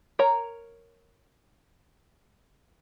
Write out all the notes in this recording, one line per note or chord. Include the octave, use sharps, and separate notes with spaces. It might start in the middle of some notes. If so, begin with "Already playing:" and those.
A#4 C#5 A#5